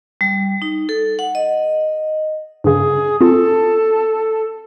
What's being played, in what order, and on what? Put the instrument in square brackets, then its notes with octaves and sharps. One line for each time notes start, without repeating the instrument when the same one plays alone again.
[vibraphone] G3
D#4
A4
F#5
D#5
[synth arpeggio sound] G2 C#3 [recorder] G#4
[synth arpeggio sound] C4 F4 [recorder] A4